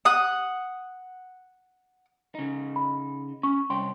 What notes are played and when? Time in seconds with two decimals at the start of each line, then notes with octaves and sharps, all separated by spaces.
0.05 F#5 D#6
2.35 C#3 D#4
2.76 B5
3.43 C#4 C#6
3.70 C2 C#5 G5 C6